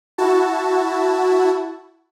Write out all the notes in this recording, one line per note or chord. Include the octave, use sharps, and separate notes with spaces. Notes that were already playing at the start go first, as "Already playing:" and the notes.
E4 F#4 A5